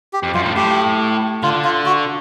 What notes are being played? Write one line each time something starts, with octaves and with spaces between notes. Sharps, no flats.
G4
F2
F#2 F4
A2
A2 G4
D3 F4
F4
F#4